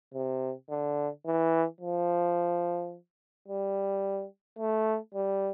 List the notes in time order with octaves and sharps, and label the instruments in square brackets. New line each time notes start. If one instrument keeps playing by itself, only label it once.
[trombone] C3
D3
E3
F3
G3
A3
G3